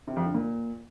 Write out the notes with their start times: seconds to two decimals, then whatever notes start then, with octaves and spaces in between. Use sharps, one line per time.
0.07 C3
0.16 F2
0.25 D3
0.34 A#2